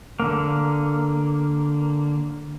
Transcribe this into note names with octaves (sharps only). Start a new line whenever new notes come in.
D3 A#3